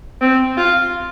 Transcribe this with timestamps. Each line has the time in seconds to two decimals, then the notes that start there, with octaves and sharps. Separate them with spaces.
0.21 C4
0.57 F4